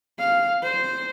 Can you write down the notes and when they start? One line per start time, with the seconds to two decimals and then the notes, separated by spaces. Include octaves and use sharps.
0.19 F5
0.63 C5